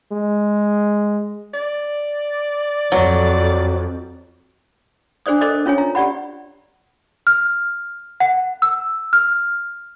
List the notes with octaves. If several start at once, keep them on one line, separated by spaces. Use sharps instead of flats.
G#3
D5
F2 F#3
D4 G#4 C5 D5 D#6
A4 A#4 C5 D5 D#5 D6
C#4 F4 C#5 G#5
A#5
G4 D5 F#5 B5
F6
F#5
E6
F6